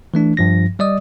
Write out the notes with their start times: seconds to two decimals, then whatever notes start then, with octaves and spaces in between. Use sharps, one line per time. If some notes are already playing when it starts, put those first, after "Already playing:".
0.14 E3 A3 D4
0.37 G2 F3 A#6
0.79 G3 D5 D#5 D#6